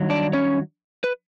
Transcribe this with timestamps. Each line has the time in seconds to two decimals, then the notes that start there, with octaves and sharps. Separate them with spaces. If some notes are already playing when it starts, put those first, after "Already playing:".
Already playing: G2 D#3 F#3
0.10 D4 D5
0.33 C#4 C#5
1.04 B4